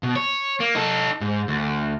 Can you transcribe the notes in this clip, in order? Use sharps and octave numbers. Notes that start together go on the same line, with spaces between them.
B2
C#5
A#3
D#4 A4
G#2
D2